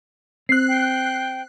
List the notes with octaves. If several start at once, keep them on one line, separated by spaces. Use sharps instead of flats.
C4 F#6 C7
G5